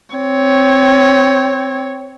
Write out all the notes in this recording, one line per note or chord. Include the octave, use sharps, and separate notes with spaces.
C4 C#5